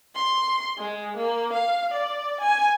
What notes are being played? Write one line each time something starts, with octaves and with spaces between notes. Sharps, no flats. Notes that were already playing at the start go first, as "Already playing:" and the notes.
C6
G#3
A#3
F5
D5
G#5